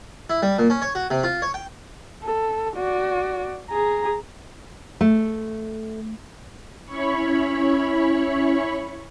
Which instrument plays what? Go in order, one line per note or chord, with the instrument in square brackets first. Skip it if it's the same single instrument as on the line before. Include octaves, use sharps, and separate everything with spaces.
[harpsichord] E4
G3
A#2
C#4
C#5
F#4
C3
F4
C#5
G5
[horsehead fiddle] A4
F#4 D5
G#4 A#5
[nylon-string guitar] A3
[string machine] C#4 E4 C#5 B5 C#6